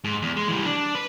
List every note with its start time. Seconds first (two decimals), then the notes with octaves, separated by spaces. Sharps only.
0.04 G#2
0.22 E2
0.37 G#3
0.48 E3 G3
0.65 D4
0.95 B4